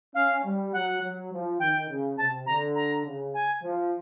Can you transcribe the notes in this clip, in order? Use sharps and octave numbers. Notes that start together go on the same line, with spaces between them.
C#4 F5
G3
F#3 F#5
F#3
F3
D#3 G5
C#3
C3 A5
D3 A#5
A#5
C#3
G#5
F3